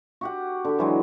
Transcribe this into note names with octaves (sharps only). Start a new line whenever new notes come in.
F#4 G4 F#5
D3 G4
E3 F#3 G#3